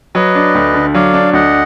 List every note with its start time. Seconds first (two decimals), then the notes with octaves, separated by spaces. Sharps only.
0.15 F#3 B4 D#5
0.35 D4
0.55 D2
0.74 D3
0.94 F#3 D5 F5
1.14 D4
1.33 D2 D#5 F#5